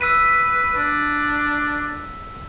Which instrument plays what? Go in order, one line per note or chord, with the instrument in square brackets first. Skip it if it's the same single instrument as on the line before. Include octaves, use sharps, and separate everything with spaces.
[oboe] B4 [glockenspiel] E6 B6 D#7
[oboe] D4